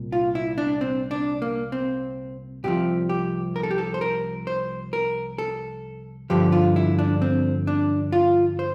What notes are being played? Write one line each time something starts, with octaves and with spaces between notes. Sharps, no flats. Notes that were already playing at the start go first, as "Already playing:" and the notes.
Already playing: C2 A#2
F4
E4
D4
C4
D4
A#3
C4
C2 C3 F3 G4
G4
A#4
A4
G4
A4
C5
A#4
C5
A#4
A4
G2 D3 F3 G4
F4
E4
D4
C4
D4
F4
C5